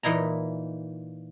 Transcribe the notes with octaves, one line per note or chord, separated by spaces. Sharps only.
A#2 E3 D#4 E4 A#5